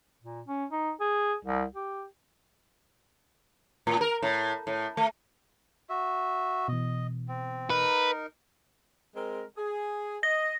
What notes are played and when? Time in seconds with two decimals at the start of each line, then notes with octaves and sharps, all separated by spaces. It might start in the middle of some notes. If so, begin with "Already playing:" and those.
0.23 A#2
0.48 C#4
0.72 D#4
1.00 G#4
1.45 C2
1.75 G4
3.87 A2
4.01 A#4
4.22 A2
4.67 A2
4.97 A3
5.90 F#4 E5
6.68 B2 E3 D#5
7.28 C4
7.70 D#4 A#4 B4
9.15 G#3 C4 A#4
9.57 G#4
10.23 D#5 A#6